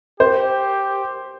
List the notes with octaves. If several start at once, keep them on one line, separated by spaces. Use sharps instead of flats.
G4 C5